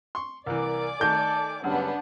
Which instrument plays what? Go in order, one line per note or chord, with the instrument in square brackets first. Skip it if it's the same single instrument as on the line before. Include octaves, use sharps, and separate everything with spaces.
[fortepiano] C6 C#6
[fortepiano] C2 E3 [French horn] A#4 [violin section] D5 G#5 D6
[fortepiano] D#3 A3 [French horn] A4 [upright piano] G6
[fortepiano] F#2 G3 [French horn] C#3 [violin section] B3 D4 F#5